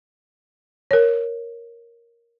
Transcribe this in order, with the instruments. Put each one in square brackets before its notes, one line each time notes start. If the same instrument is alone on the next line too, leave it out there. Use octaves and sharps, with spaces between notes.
[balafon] A#4 C#5